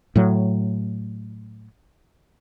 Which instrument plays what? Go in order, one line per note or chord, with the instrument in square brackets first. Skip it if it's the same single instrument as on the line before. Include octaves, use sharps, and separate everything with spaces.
[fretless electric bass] A2 F#3